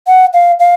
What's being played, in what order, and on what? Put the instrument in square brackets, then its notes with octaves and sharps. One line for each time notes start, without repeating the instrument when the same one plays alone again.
[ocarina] F#5
F5
F5